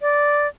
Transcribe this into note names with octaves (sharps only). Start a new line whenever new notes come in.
D5